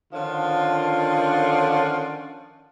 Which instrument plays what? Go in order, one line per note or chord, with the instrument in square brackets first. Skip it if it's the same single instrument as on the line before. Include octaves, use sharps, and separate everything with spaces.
[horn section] D3 D#3 F3 C#4 F4